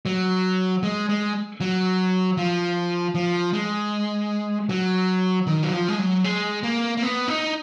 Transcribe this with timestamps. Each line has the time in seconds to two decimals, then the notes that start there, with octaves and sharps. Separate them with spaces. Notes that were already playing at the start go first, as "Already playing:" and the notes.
0.06 F#3
0.83 G#3
1.09 G#3
1.60 F#3
2.37 F3
3.15 F3
3.53 G#3
4.69 F#3
5.47 D#3
5.63 F#3
5.73 F3
5.88 G#3
5.99 F#3
6.24 G#3
6.63 A#3
6.97 A#3
7.03 B3
7.28 D#4